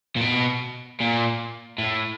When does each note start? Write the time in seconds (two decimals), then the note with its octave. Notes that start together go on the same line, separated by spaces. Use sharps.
0.16 A#2
0.21 B2
1.00 A#2
1.78 A2